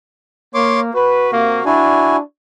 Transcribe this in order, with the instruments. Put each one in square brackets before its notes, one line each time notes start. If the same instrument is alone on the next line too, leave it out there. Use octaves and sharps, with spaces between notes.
[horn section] A#3 [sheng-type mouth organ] C#5 C6 D6
[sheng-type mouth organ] F#4 [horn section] B4
[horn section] C3 A#3
[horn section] D4 [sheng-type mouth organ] E4 F#4 G#5